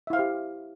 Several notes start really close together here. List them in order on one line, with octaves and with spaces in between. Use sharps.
E5 E4 F5 C5 G4